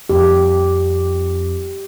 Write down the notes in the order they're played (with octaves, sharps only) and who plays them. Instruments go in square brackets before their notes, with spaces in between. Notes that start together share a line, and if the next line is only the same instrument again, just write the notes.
[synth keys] F2 [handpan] G4